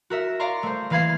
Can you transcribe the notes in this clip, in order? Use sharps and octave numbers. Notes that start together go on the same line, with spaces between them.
F#4 A#4 E5
D5 F5 A#5 C6 C#6
A3 C5
E3 A#3 F5 B5 G#6 C7